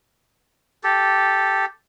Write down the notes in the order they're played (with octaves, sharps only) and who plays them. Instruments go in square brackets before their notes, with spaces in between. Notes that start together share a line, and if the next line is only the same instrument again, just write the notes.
[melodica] G4 A4